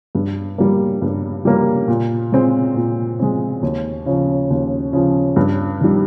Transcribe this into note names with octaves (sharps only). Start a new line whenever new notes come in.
G2
G3 A#3
G2
G3 A#3
A#2
G#3 C4
A#2
G#3 C4
D#2
C#3 F3
D#2
C#3 F3
G2
D#3 G3